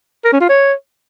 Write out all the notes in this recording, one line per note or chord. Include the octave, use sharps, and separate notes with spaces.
A#4
C#4
F4
C#5